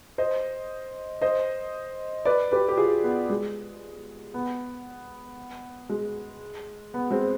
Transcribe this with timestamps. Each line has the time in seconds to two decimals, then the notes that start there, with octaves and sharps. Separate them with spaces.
0.18 C5 D#5
1.22 C5 D#5
2.25 B4 D5
2.52 G4 B4
2.69 G4
2.77 F4 G#4
3.04 B3
3.30 G#3
4.34 B3
5.90 G#3
6.94 B3
7.11 G#3 C4